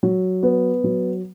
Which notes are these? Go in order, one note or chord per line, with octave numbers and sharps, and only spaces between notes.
F#3
B3
F#3